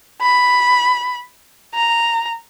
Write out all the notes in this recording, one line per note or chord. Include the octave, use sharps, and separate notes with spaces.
B5
A#5